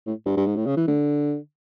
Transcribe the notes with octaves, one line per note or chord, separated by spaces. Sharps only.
A2
G2
G2
G#2
A2
C#3
E3
D3